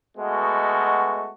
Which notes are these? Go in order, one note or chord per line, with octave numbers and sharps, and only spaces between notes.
B2 G#3 A3 B3 F#4